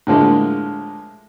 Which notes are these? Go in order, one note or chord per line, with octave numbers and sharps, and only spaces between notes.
A2 D3 F3 G#3 A#3